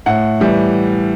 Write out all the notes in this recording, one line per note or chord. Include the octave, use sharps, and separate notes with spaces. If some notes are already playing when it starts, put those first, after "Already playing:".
A2 F#5
E3 G3